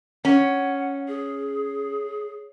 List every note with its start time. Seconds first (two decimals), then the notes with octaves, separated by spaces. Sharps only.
0.25 C#4 F#5
1.08 G#4